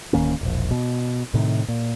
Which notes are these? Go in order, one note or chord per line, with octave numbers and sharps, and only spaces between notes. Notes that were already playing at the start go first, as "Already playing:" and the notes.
D1 D#3 A#3 C#4
E1 A#1
B2
A2 C3 D#3
A#2